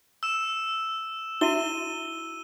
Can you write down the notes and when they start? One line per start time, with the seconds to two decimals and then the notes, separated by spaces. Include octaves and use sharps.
0.23 E6 E7
1.41 E4 F#4 E5 D#7 G7